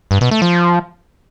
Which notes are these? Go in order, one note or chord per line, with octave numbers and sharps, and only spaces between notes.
G2
B2
A3
F3